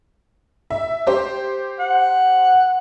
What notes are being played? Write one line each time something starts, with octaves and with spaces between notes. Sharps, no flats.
E5
G4 C5
F#5